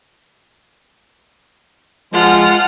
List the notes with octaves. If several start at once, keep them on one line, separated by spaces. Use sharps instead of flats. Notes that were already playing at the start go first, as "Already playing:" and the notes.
F3 G#3 F4 F#5 F6